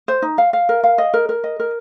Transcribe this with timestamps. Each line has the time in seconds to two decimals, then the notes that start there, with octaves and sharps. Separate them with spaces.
0.08 C5
0.22 D#4
0.38 F5
0.53 F5
0.69 A#4
0.84 F5
0.98 D#5
1.14 A#4
1.29 A#4
1.44 D#5
1.59 A#4